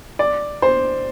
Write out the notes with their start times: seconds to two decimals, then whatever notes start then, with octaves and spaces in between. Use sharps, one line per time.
0.19 D5
0.62 C5